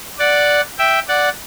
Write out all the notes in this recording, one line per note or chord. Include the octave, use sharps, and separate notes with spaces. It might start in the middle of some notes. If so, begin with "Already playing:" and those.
D5 F#5
E5 G5
D5 F#5